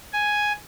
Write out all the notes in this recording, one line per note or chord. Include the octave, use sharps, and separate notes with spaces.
G#5